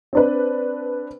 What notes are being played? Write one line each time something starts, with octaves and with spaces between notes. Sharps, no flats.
C4 D4 B4